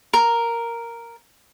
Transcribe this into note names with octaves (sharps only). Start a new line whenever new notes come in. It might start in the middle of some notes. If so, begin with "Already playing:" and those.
A#4